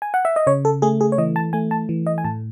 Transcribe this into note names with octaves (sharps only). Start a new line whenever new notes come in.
G#5
F#5
E5
D#5
C#3 C#5
A4
A3 G#4
G#4
C#5
E3 D#5
A5
A3 G#5
A5
E3
D#5
G#5
A2 A5